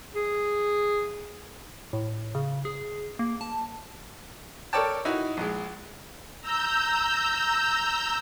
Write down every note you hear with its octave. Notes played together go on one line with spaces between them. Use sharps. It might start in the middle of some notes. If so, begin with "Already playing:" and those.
G#4
A2
C#3
G#4
A#3
A5
A4 A#4 C#5 D5 G5 A5
D#4 E4 F#4
A#1 G#3
A#5 E6 G6